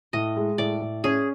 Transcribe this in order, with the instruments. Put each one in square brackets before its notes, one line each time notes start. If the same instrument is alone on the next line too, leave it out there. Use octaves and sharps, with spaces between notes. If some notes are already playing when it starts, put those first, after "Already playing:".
[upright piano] A2 [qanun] D#5
[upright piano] G#3
[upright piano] A2 [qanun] D5
[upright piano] A2
[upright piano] C#4 [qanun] G#4